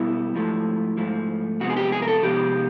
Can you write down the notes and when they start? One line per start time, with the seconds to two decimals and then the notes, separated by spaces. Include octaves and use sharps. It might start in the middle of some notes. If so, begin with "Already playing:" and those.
Already playing: B2 G3 B3 E4
0.35 G#2 F3 A3
0.98 G#2 F3 A3
1.60 C3 F3 G#3 B3 F#4
1.70 G#4
1.77 G4
1.92 G#4
2.02 A#4
2.08 A4
2.23 C3 F3 G#3 B3 G4